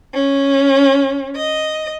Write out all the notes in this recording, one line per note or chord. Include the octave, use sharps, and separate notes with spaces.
C#4
D#5